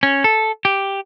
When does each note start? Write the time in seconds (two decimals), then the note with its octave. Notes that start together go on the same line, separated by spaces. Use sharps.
0.03 C#4
0.24 A4
0.65 G4